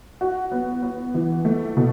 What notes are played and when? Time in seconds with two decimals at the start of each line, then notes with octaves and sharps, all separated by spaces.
0.21 F#4
0.52 B3
0.82 B3
1.14 E3
1.45 A3
1.77 B2